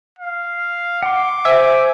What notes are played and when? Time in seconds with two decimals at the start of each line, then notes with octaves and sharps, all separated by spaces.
0.19 F5
1.03 F#5 C6 D6
1.45 C5 E5 G#5